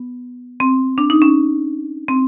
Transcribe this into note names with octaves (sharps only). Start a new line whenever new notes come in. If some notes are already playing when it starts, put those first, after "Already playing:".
Already playing: B3
C4
D4
D#4
C#4
C4